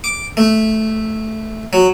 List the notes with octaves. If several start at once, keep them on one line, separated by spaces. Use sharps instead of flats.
D6
A3
F#3